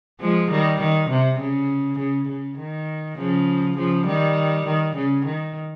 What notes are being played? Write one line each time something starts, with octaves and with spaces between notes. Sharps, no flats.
F3 G#3
D#3 G3
D#3
C3
C#3
C#3
C#3
D#3
C#3 F3
C#3 F3
D#3 G3
D#3
C#3
D#3